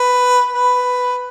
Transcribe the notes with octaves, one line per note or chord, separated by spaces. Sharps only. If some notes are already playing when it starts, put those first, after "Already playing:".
Already playing: B4
B4